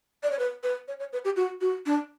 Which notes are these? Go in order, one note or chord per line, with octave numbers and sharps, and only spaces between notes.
D5
C#5
B4
B4
C#5
C#5
B4
G4
F#4
F#4
D4